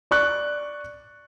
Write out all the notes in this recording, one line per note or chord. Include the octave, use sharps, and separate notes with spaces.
D5 C#6 F#6